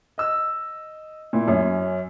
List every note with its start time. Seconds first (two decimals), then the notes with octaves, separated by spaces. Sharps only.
0.18 D#5 E6
1.33 A#2 E4
1.48 F#2 C#4